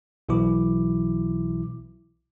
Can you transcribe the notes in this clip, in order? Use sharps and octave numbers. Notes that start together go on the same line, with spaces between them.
B1 B2 E3 F#3 E4 D6